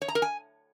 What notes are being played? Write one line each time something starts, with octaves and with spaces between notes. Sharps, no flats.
C#5
A#5
A#4
G#5